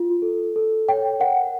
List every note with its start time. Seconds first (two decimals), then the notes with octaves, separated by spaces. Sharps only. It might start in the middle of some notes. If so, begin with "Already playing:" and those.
Already playing: F4
0.22 A4
0.56 A4
0.88 C#5 G5
1.20 A#4 F#5